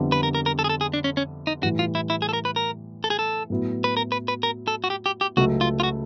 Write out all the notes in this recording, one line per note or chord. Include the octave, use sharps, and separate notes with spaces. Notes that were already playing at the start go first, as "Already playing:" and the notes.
Already playing: F2 D3 G3 B3 E4
B4
A#4
A#4
A#4
A4
G#4
A4
G#4
D4
C#4
C#4
D#4
A2 E3 G3 F#4
F4
E4
E4
G#4
A4
A#4
B4
A#4
A4
G#4
A4
A2 F#3 B3 E4
B4
A#4
B4
B4
A#4
A4
F#4
G4
G4
G4
C#2 C#3 F#3 A3 F#4
F4
F4
F#4